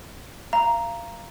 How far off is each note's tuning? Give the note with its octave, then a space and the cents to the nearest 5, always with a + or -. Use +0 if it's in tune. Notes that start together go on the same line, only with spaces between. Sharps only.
F5 -25 A#5 +0